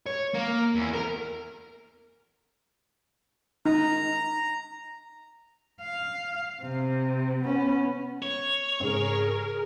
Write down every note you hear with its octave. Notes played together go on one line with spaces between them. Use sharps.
C#5
A#3
E2
A#4
D#4 A#5
F5
C3
B3 C#4
C#5
G#2 C#3 C4 G#4 A#4